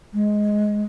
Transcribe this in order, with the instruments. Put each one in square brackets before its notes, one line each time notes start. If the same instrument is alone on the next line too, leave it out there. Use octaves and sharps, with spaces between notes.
[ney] G#3